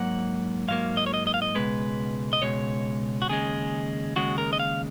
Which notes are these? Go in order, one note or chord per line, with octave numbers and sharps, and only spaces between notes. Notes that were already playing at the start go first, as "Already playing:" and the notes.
Already playing: G#2 F#3 A#3 F#5
G#2 F#3 A#3 F5
D#5
C#5
D#5
D#5
F5
D#5
C#2 B2 G#3 B4
D#5
C#2 B2 G#3 C#5
F#4
D#2 C#3 G#3 G#4
D#2 C#3 G#3 F#4
A#4
D#5
F5